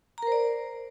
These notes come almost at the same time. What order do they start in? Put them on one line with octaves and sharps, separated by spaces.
A#5 A#4 C5 D5